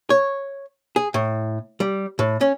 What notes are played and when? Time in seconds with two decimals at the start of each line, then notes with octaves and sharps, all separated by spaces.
0.10 C#5
0.96 G#4
1.14 A2
1.80 G3
2.19 A2
2.41 C#4